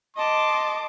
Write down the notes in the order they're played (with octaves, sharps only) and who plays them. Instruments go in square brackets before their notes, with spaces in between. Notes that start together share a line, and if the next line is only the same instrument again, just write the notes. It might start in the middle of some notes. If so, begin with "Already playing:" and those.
[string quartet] D#5 A5 D6 [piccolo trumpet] C6